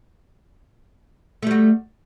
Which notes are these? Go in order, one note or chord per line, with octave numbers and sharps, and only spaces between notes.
G3 A3 F#4